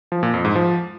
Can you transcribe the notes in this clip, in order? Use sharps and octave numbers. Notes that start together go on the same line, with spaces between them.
F3
A#2
F2
G#2
F3